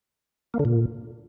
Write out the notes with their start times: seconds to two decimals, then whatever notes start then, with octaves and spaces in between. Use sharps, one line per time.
0.54 A#3
0.59 D3
0.65 A#2